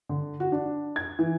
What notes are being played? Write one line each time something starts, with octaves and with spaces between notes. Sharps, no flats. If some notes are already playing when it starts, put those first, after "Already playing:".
D3
F#4
D4
G#6
E3